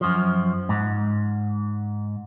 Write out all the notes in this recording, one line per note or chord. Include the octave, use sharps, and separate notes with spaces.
F#2 F3
G#2